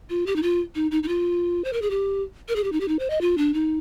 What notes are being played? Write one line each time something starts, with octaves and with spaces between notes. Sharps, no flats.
F4
G4
D#4
F4
D#4
D#4
D#4
F4
C5
A#4
G#4
G4
A#4
G#4
G4
D#4
G4
D#4
C5
D#5
F4
D4
D#4